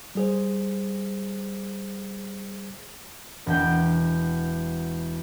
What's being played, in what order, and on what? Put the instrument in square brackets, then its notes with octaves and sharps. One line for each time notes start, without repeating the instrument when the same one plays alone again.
[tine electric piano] G3 G#4 C5
[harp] E1 G5